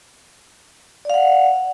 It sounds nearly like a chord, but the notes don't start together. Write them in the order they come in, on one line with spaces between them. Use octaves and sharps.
D5 F5 F#5